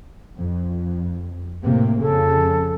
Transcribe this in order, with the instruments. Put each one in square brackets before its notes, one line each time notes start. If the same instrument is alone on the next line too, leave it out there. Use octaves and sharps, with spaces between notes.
[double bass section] F2
A2 C3 A#3
[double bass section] F2 C#3 [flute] A4